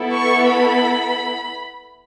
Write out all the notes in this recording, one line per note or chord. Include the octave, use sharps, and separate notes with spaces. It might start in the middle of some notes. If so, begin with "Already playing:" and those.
Already playing: B3 E4 A4
C#6
B5